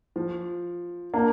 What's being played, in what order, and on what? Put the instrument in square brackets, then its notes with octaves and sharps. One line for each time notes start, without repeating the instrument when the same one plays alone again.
[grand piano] F3
A#3 D4